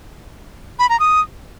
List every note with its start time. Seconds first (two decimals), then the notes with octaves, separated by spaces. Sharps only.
0.79 B5
0.89 A#5
1.00 D#6